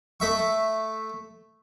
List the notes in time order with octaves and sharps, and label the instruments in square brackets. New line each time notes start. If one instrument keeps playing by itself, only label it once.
[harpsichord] A3 E5 C#6